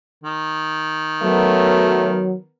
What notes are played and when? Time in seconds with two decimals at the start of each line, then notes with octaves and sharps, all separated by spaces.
0.24 D#3
1.23 F#3 A3 B3 A#4